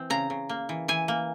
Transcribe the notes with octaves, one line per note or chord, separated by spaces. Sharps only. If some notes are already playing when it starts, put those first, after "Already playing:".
Already playing: E3 C4
C#3 A#5
C#3
A#3
E3
E3 G#5
A#3